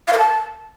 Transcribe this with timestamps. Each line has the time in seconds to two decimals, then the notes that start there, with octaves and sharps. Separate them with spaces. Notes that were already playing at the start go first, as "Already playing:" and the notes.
0.07 F5
0.13 A#4
0.18 A5